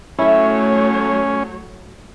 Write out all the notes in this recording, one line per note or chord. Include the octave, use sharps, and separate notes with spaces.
F#3 A3 C#4 E4 C#5 E5